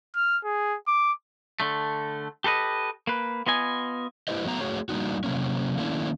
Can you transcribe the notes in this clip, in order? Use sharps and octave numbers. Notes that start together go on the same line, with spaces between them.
F6
G#4
D6
D3 A3
G4 A4 B4 D#5
A#3 B4
B3 F4 D#5 G#5
E4 F#4 G4 B4 C5 D#5
F#3 A3 B3 D5 A#5
A3 F#4 G#4 C#5
G3 A#3 D4 D#4 F#4
C3 F#3 A#3 C#4
D#3 A3 A#3 C#4 D4 E4